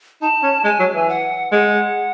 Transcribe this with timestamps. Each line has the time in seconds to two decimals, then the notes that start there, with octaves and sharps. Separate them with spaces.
0.22 D#4 A5
0.43 C#4
0.64 G#3 G#5
0.80 F#3
0.94 E3
1.09 F#5
1.52 G#3 F#5